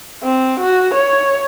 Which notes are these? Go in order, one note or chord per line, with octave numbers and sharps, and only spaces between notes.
C4
F#4
C#5